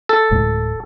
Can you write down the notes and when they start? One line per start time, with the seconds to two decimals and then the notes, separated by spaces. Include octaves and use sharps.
0.09 A4
0.31 D1 A2 G#3